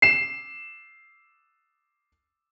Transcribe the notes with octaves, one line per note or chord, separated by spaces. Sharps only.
C7 E7